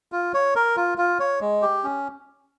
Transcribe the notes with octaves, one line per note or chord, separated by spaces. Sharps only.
F4
C#5
A#4
F4
F4
C#5
G#3
G4
C#4